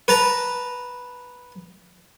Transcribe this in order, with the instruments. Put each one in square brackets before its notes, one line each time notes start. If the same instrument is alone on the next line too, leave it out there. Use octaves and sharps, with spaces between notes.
[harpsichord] B4 A5 A#5